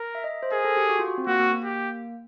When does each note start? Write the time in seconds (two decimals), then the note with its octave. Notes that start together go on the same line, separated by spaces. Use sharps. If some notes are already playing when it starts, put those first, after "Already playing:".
Already playing: A#4
0.15 E5
0.24 D#5
0.43 C5
0.52 G#4 A#4
0.65 A4
0.77 G4
0.90 F#4
0.99 F4
1.08 F#4
1.18 C4
1.27 A#3 F#4
1.40 A#3
1.52 A#3
1.64 G4